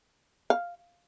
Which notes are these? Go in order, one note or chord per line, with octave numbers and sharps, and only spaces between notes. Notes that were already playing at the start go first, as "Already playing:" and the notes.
F5